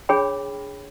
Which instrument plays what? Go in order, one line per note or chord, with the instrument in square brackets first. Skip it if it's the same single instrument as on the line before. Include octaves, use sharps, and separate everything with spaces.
[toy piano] D4 G#4 C#5 G5 B5